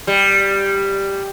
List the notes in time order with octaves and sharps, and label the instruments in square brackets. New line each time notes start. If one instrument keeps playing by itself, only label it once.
[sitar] G3